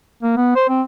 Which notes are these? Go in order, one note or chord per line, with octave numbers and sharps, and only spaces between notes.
A#3
B3
C5
C4